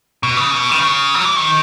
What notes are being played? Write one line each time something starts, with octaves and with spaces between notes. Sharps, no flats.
B2
C#3
B2
D#3
C#3
F#3
E3
D#3